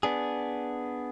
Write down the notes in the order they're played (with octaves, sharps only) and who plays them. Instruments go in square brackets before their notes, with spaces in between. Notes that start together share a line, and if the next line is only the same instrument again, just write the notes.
[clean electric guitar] B3 D4 G#4